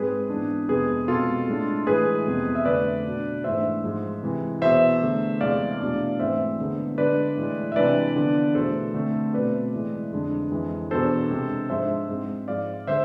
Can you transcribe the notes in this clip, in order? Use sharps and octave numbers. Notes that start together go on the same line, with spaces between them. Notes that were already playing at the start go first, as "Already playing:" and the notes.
Already playing: G#2 G#3 C4 G#4 B4
G#2 E3 B3 D4
F2 C3 G#3 B3 G#4 B4
B2 G#3 C4 F4 A4
A2 G#3 D4
A2 E3 G#3 G#4 B4
F2 C3 G#3 B3
E5
F2 D3 A3 C4 B4 D5
B2 B3 D4
G#2 E3 A3 D4 C5 E5
G#2 F3 G#3
C3 E3 G#3
E2 B2 B3 C5 E5
E2 D3 A3
E2 C3 G#3 D5 F5
E2 B2 A3 D4
G#2 E3 A3 C4 C5 E5
E2 D3 G#3 B3
D3 G#3 D4 B4 D5
A2 E3 G#3
E5
C3 E3 G#3 D4 B4 D5
D3 F3 B3 D4
E2 B2 A3 A4 C5
D3 A3 C4
B2 A3 C4 B4 D5
A2 E3 G#3
F2 D3 G#3 D4
F2 E3 G#3
E2 B2 B3 D4 A4 C5
C3 G#3 D4
G#2 F3 G#3 D4 C5 E5
G#2 G#3 C4
G#2 F3 G#3 D5 F5
D3 G#3 C5 E5